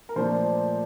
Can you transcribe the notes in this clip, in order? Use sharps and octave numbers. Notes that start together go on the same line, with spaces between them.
A#4
A#2 F3 A3 D4 C5